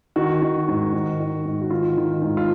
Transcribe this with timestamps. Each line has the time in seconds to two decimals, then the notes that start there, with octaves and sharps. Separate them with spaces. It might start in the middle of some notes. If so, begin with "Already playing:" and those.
0.16 D#3 F#4
0.42 D#3
0.68 G#2
0.93 D#3
1.20 D#3
1.45 G#2
1.61 F#4
1.70 D#3 F4
1.97 D#3
2.22 G#2
2.37 F4